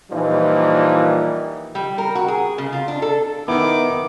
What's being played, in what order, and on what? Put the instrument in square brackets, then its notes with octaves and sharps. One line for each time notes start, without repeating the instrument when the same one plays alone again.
[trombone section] A#2 E3 F3 G3 D#4
[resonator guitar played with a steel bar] G3
A#4
F#4
G#4
C#3
F4
D4
A4
[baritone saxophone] D#3 [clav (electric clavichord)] B3 E4 [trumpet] D6